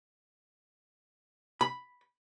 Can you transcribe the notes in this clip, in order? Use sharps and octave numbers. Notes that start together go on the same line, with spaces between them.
B5